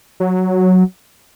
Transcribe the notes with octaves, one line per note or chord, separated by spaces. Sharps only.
F#3